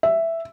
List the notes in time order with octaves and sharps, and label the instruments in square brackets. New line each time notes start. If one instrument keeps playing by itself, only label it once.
[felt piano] E5